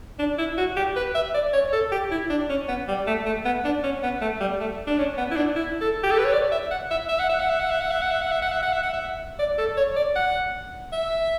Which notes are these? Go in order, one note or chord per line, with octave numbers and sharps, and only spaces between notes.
D4
E4
F#4
G4
B4
E5
D5
C#5
A4
G4
E4
D4
C#4
B3
G3
A3
A3
B3
D4
C#4
B3
A3
G3
A3
D4
C#4
B3
E4
D4
E4
A4
G4
A4
B4
C#5
D5
E5
F#5
E5
E5
F#5
E5
F#5
E5
F#5
E5
F#5
E5
F#5
E5
F#5
E5
F#5
E5
F#5
E5
F#5
E5
D5
A4
C#5
D5
F#5
E5